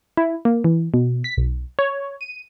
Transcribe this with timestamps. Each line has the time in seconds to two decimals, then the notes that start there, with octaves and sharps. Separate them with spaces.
0.17 E4
0.45 A#3
0.64 E3
0.94 B2
1.24 B6
1.37 B1
1.79 C#5
2.21 D#7